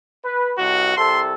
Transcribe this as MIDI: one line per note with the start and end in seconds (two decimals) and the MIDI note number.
0.24 0.53 71
0.58 0.94 36
0.58 0.95 66
0.97 1.34 36
0.97 1.34 48
0.97 1.34 69
0.97 1.21 84